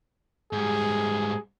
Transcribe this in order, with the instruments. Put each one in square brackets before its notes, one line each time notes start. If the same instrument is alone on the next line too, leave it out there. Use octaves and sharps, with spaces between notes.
[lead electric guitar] G#2 G3 [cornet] G#4